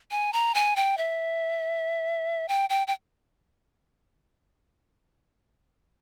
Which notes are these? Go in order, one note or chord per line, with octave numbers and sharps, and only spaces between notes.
G#5
A#5
G#5
G5
E5
G5
G5
G5